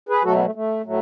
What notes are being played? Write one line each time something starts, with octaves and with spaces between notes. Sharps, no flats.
G#4 B4
B2 F#3 A3 F#4 A4
B3
A3
A3
A2 F#3 A3